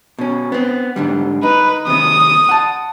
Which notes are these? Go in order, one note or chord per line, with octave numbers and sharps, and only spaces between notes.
B2 C#4
B3 C4
G#2 D3 G3
D#4 B4
D#2 C3 D#6
F#5 A5